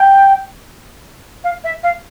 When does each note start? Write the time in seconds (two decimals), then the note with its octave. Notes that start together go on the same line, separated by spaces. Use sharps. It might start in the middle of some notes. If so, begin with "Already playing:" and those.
Already playing: G5
1.44 F5
1.64 E5
1.83 F5